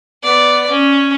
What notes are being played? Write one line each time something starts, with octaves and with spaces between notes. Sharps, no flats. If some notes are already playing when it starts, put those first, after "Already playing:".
B3 D5
C#4